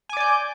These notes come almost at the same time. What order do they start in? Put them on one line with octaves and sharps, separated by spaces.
G#5 D6 D5 G6